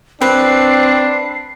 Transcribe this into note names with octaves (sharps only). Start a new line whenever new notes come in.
C4 D4 B4 C7